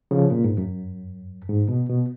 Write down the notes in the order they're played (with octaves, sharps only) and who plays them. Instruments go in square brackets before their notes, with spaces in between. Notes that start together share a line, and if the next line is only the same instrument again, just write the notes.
[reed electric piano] C#3 F3
A#2
G#2
F#2
G#2
B2
B2